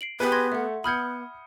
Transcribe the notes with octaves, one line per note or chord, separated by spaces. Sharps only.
C7 D7 F#7
B3 G4 G#4 B4
C6 G#6 A#6
A3 E5 F#5
B3 B5 D#6 F6 G6 G#6 C#7